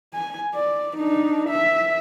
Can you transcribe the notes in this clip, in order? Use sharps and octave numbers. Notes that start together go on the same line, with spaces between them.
G#5
D5
D4 D#4
E5